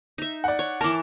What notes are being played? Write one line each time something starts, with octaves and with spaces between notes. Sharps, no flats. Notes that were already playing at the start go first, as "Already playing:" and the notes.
D#4 E5
D5 F#5
C#5
E3 A#4 A5 D6